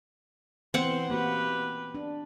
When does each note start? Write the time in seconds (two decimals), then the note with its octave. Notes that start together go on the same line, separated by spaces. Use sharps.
0.74 E3 B3 C4 F#5 C6
1.10 A#3 B3 F#4 G4 B4
1.95 D4